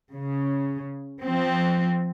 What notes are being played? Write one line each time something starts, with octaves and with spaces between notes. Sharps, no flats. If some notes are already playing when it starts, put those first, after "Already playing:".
C#3
F3 C4